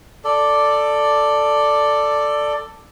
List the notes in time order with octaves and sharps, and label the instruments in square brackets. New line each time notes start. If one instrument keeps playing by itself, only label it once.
[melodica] A4 D5